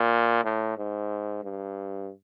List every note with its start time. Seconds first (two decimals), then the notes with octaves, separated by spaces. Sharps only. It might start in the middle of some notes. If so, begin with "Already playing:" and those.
Already playing: A#2
0.44 A2
0.77 G#2
1.43 G2